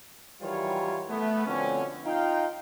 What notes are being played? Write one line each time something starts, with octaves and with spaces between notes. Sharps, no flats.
D#3 E3 F#3 G3 F4 C#5
A3 B3
B2 D3 F3 C4 C#4
D#4 F4 F5 G5